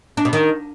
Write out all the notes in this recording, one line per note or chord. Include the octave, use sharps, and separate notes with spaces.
D4
B2
D#3